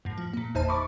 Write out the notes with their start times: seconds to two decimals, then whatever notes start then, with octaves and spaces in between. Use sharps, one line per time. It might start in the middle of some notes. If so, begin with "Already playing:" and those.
0.05 F#2 A2
0.18 F3
0.33 A#2 A#3
0.55 G1 E2 D#4 C5 D#5 A5
0.68 B5 C#6 D6 A6